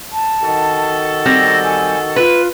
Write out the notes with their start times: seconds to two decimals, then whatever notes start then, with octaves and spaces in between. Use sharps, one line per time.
0.12 A5
0.43 D#3 F#4 A4
1.26 G3 C4 A#6
1.64 G#5
2.16 F4 B4